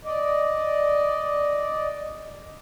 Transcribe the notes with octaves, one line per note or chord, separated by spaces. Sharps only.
D5 D#5